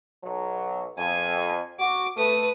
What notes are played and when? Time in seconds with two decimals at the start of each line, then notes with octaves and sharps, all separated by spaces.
0.24 B1 F#3
0.98 F2 G#5
1.80 F#4 D6
2.17 A3 B4 D#6